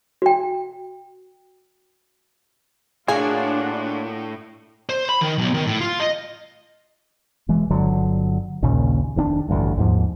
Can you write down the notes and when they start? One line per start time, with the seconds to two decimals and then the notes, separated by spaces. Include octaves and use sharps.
0.22 F#4 G5
3.08 A2 A#3 D4 F4 F#4 G#4 C#5 F#5
4.89 C5
5.09 B5
5.21 D#3
5.38 B1
5.54 D#3
5.67 A2
5.81 F4
6.00 D#5
7.48 E1 E3 G#3
7.70 G1 D3 F#3
8.62 A#1 D#2 A#2 C#3
9.16 F1 D#3 C#4 D4
9.49 A1 D2 G2
9.77 D#2 G#2 F3